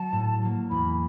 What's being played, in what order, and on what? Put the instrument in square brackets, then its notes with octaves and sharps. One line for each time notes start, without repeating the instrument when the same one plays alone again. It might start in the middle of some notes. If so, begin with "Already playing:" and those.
Already playing: [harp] F#3 [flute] A5
[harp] A2
F#3 A#3
[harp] E2 [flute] B5